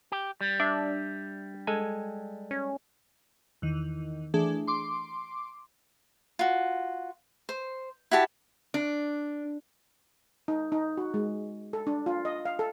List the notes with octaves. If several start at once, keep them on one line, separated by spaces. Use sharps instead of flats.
G4
G3
D4 D5 E5
G#3 A4 G#5
C#4
E2 D#3
E3 A3 D4 G#4
C6 D6
F4 F#4
C5
E4 F#4 G4 A5
D4
D#4
D#4
F#4
G#3
A4
D4
F4
D#5
F5
A4